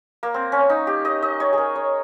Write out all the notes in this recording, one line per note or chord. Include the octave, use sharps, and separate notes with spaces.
A#3
C4
C#4
D#4
G4
D#5
D#5
C#5
G#4 A#4
C#5